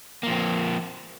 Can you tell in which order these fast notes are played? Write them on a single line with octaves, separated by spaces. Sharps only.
A#3 F3 C4